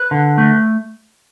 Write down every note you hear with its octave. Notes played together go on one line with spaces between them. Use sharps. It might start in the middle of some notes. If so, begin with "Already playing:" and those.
Already playing: B4
D3
A3